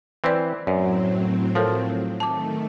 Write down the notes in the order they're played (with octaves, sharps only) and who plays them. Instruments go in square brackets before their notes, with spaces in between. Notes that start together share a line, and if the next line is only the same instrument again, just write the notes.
[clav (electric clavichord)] E3 C4 [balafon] B4 D5
[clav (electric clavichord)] F#2 [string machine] A2 F#3 C4 [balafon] D5
[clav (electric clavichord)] F3 [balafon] A4 A#4 C#5
[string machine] D#3 A3 [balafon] A5 D6